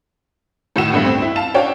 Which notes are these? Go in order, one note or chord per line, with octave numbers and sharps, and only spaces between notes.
A2 D#3 F#4 E6 E7
D2 G2 A3 B3
C4
E4
F5 A5 E7
C#4 D4 F#4 C#5 F5 G5